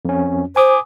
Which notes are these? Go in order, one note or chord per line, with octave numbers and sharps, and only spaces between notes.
F2 C#4
C5 G#5 D6 D#6